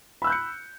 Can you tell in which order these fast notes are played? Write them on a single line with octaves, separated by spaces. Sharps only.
B5 E6 F#6 G6 C#7